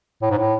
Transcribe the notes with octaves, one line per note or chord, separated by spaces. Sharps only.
A2
G#2
A2